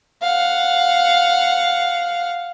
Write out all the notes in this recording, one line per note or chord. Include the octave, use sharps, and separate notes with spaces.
F5 F#5